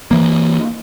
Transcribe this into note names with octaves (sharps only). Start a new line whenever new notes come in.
E3 A#3